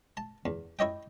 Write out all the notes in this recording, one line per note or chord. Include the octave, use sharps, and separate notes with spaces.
A5
E2
E4 C#5 D#5 G5